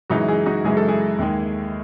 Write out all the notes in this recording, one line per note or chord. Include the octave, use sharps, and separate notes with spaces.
F#2 C#3 E3 G#3 D#4 F#4
E4 G#4
D#4 F#4
F#2 C#3 E3 G#3 G#4
A4
E4 G#4
D#2 D#3 G#3